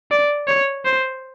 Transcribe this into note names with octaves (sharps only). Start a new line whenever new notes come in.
D5
C#5
C5